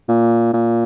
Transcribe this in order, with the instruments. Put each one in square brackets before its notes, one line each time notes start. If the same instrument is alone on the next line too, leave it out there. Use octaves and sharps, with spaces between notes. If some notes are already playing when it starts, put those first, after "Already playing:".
[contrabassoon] A#2
A#2